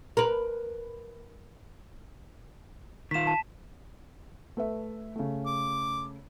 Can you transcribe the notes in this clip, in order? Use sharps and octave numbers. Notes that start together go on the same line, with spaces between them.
A#4 B4
D#3 F4 B6 E7
A5
A3 B4 E5
C#3 A3
D6